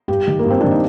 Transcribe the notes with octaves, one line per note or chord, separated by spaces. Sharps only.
G2 G4
D#3
A#3
G2
C4
D#3 D4
D#4